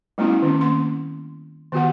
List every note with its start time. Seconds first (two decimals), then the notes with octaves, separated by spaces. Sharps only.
0.18 G3 A3 B3 C#4 E4 F#4
0.42 D#3 C4 C#4
0.61 A#3 C6
1.72 D#3 B3 F#4 G4 F#5